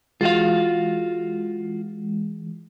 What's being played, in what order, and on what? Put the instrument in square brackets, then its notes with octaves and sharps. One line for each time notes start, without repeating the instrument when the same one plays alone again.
[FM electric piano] E3 G#3 [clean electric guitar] F4 F#4 F5